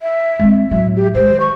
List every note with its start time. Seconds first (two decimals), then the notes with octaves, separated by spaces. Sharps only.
0.02 E5
0.39 G#3 C4
0.71 A2 F#3 E5
0.96 G4
1.15 D#3 G#3 C5
1.40 C#6